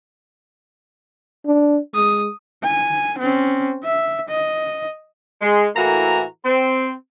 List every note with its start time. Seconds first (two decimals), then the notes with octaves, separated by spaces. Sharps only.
1.46 D4
1.95 G#3 D#6
2.63 G#5
3.19 C4 C#4
3.84 E5
4.29 D#5
5.42 G#3
5.76 A2 E3 A#3 F#4 A4 A#5
6.45 C4